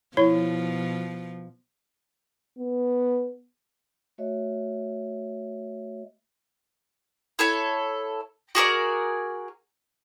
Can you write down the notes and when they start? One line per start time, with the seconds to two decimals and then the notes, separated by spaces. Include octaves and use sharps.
0.17 B2 F3 E4 C#5
2.58 B3
4.18 A3 F#4 C#5 D#5 E5
7.39 E4 A4 C#5
8.55 F#4 G#4 A#4 D5